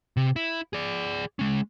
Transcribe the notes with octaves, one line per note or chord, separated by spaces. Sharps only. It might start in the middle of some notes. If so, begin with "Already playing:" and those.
C3
E4
G#4 D5
G#3 C#4